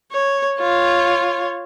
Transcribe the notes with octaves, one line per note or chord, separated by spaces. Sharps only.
C#5
F4 C#5